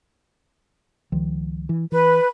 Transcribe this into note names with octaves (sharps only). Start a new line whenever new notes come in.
C#2 D#3 F3
E3
E3 B4